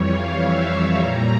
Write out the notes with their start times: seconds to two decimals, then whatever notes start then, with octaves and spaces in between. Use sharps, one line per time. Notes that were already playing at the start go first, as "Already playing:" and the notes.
Already playing: F2 E3 G3 C#5
0.09 F5
0.39 E5
0.69 C#5
0.99 A#2 G3 A#5